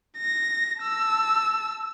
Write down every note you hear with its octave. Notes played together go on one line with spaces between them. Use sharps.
A#6
A5 E6